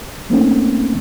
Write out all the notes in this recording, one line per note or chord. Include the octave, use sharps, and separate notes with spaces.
A3 A#3 C4 C#4 D#4